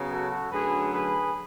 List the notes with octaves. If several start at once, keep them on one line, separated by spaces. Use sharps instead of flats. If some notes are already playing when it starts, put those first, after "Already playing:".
Already playing: C#3 F#3 B3
F#4 A4
F#2 D3 F#3 A3 G#4 B4
G#4 B4